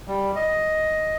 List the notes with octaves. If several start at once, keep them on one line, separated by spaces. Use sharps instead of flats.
G3
D#5